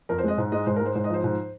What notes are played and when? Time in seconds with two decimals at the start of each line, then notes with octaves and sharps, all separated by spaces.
0.09 F2 A#4
0.18 C5
0.24 G#3 D#5
0.37 G#2 C5
0.52 G#3 D#5
0.66 G#2 C5
0.76 A#4
0.81 G#3 C5
0.95 G#2 C5
1.04 D#5
1.10 F3 C5
1.24 G#2